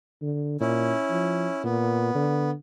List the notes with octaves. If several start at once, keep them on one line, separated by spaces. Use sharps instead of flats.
D3
A#2 C#4 E4
F3
A#2 B3
D3